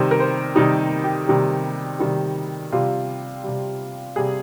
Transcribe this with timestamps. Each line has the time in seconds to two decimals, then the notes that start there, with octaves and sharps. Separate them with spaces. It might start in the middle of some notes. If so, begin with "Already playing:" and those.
Already playing: C3 D#3 G3 C5
0.11 A#4
0.20 C5
0.55 C3 D#3 G3 D#4
1.04 G4
1.27 C3 D#3 G3
1.99 C3 D#3 G3
2.72 C3 G3 F4
3.43 C3 G3
4.16 C3 G3 G#4